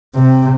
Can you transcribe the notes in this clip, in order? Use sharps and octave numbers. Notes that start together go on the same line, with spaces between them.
C3